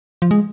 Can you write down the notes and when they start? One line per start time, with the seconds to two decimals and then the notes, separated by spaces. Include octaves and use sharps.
0.22 F3
0.31 G#3